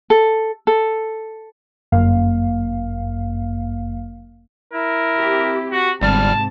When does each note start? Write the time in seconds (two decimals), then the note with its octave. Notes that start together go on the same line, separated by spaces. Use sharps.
0.10 A4
0.67 A4
1.92 G1 F#2 A#3 F5
4.73 E4 A#4
5.17 C4 G4
5.72 F#4
6.01 G1 G#2 C3 G3 A5 F6